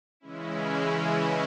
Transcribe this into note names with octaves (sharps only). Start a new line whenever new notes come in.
C#3 E3 G#3 C#4 E4